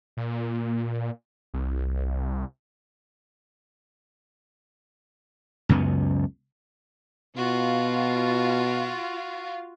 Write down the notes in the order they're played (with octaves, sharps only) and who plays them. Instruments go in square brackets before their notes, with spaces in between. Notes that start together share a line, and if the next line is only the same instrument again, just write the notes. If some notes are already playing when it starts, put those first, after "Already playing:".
[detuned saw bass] A#2
C2
[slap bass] C#2 F#2 C#3 B3
[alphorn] B2 [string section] F4 [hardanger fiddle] F#4